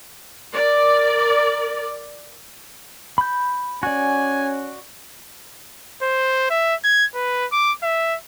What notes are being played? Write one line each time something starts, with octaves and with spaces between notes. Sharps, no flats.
A#4 D5
B5 G6
C#4 F#4 D5 G#5
C5
E5
G#6
B4
D6
E5